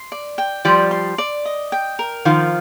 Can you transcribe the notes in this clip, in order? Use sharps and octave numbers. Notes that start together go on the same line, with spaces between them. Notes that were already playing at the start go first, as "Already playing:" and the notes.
Already playing: C6
D5
G5
F3 G3 D5
C6
D5
D#5
G5
A#4
D#3 F3 F4